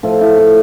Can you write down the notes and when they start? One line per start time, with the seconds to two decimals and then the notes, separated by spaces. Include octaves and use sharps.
0.03 A2 F3 A3 F4
0.21 E4
0.38 F4